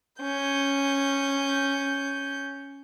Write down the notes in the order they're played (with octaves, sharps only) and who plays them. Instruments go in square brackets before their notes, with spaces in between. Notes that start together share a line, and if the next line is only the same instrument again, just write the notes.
[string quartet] C#4 G6